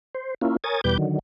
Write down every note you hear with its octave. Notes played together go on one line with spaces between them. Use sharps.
C5
A#3 C#4 E4 F4
A#4 C#5 G#5 D#6 A6
E2 B2 G3 B4 D6 G6
D3 D#3 F#3